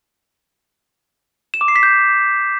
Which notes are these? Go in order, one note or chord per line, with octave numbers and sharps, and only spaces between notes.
E7
D6
C7
B6
G6